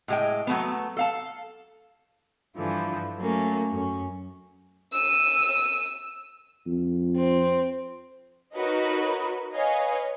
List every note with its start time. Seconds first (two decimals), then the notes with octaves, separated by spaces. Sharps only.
0.08 A2 G#3 G5
0.47 F#3 A3 B3
0.97 A4 F5 A5
2.56 G2 D3 E3 F3
3.19 F#3 A3 A#3 C#4
3.73 F#2 C#4
4.93 E6 D#7
6.67 F2
7.17 C4
8.55 D#4 F#4 A#4 B4 C#5 D#5
9.54 B4 C#5 D#5 F5 G#5